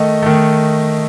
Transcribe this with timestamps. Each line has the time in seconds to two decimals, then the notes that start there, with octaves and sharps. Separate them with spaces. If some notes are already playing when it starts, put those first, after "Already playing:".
Already playing: D#3 A3 D#5
0.22 D#3 A3